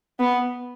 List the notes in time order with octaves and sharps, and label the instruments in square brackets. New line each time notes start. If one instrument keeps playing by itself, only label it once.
[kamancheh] B3